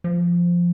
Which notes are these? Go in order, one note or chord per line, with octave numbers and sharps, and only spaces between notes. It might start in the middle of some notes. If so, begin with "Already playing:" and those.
F3